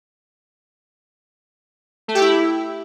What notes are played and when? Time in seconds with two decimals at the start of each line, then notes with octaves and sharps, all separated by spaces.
2.08 A3
2.15 G4
2.21 E4